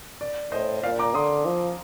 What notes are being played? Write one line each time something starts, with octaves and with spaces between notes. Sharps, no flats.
D5
A2 C5 D#5
A#2 D5 F5
A#5 D6
D3 C6 D#6
F3